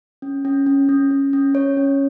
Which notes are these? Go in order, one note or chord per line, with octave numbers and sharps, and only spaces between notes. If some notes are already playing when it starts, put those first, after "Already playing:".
C#4
C#4
C#4
C#4
C#4
C#4
C#4 C#5
C#4